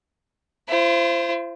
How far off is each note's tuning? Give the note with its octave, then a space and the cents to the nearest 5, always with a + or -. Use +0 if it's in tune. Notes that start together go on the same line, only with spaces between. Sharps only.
F4 -45 C5 +0